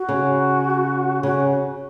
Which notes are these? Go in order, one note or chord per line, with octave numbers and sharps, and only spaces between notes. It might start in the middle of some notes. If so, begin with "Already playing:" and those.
Already playing: F#4
C#3
C#3 F#4